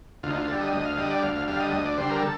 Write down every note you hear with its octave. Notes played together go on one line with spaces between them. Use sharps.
D2 F4
D#4
F4
D3 G3 A4
D#5
D2 D#5
F5
D3 G3 D#5
D5
D2 F5
F5
D3 G3 F5
D#5
D2 D#5
D5
D3 G3 C5
A#4
A4